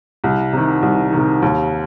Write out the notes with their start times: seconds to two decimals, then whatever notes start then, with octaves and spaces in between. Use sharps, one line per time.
0.24 C2
0.53 C3 D#3
0.82 C2
1.12 C3 D#3
1.42 D#2